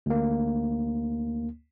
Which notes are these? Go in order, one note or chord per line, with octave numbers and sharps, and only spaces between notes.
D2 A#3